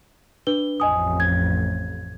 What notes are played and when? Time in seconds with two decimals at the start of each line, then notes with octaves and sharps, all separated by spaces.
0.47 D4 B4 G7
0.80 A1 F2 D#5 G#5 D#6
1.20 G#6